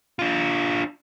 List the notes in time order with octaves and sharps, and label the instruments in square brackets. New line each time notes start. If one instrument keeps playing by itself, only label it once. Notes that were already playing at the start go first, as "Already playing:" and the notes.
[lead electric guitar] D4 F4